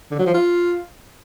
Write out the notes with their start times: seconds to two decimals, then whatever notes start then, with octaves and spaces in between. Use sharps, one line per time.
0.11 D3
0.19 F#3
0.27 F3
0.34 F4